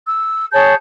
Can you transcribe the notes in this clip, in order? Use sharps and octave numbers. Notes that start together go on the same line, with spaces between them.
E6
G#4 C#5 A5 G6